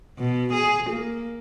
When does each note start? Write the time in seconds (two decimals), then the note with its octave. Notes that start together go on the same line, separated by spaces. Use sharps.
0.19 B2
0.53 G#4
0.90 A#3